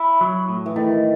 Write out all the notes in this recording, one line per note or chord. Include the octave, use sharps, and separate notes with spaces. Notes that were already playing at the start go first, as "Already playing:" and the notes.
Already playing: E4
F#3
A2
E3
D#3 A3